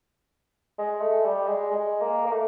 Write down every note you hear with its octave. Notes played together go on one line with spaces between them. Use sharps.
G#3
A3
G3
G#3
G#3
A#3
A#3
A3